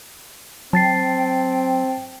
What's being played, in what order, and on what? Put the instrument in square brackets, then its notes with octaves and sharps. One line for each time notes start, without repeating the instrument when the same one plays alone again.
[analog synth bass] F#3 [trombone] C4 [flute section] G5 [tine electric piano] A5 A6 C7